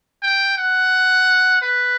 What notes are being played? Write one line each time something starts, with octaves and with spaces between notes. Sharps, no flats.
G5
F#5
B4